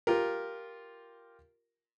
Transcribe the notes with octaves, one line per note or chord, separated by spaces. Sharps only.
F4 G4 A#4